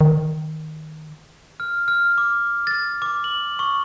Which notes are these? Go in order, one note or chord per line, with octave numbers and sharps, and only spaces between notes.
D#3
F6
F6
D6
A6
D6
F#7
C#6